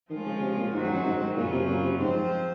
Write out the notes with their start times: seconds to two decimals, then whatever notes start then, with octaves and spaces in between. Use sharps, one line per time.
0.10 D#3 F3 G#3 C#4 F4
0.26 C#3
0.42 C3
0.57 A#2
0.73 G#2 D#3 F#3 C4 F#4
0.84 F#2
0.94 F#2
1.05 G#2
1.21 G#2
1.36 F#2 A#2 C#3 F#3 C#4 F4
1.52 C3
1.68 A#2
1.84 C3
2.00 G#2 F3 C4 F4 C5